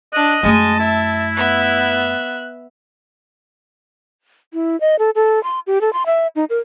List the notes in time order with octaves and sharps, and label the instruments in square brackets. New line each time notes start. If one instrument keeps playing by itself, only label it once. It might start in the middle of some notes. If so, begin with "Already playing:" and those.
[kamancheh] D4 F#6 [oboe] D#5
[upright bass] F#2 A3 [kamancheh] G#3 [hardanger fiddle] A5
[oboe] E4 [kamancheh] E5
[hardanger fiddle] B3 E5 [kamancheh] F#6
[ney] E4
D#5
A4
A4
C6
G4
A4
C6
E5
D#4
A#4